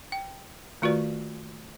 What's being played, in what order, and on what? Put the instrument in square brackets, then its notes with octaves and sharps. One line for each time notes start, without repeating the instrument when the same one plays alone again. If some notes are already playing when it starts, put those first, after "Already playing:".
[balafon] G5
D#3 A3 F4 F#4 B4 D5